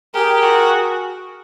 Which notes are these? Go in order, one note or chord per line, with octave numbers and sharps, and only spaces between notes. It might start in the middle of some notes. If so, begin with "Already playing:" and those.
G4 G#4 A#4
F#4